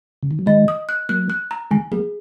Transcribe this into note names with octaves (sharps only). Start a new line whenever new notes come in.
C#3
D#3
F#3
D#3 G#3 D#5
D#6
F#6
F#3 A#3 F#6
F#6
A#5
D#3 G#3 G#5
F#3 A#3 G#4